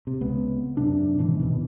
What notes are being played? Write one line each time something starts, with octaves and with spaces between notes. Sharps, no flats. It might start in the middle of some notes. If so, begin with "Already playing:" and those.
C3
C#2 B3
F#2 C3 D4
G#2 B2 D#3 E3
D#2 B2 D#3 E3